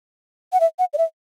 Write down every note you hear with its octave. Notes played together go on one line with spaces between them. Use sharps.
F#5
E5
F#5
D5
E5